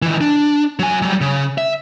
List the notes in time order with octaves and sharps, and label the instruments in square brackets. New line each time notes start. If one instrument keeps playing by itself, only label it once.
[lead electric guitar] D#3 E3
D4
F#3 G#5
F#3 G3
C#3
E5